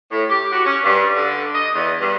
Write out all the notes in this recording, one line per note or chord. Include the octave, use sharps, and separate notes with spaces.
A2
G4
F#4
C#4
G2
D3
D#5
E2
G2